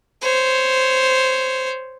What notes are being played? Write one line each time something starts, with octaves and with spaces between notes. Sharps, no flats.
C5 C#5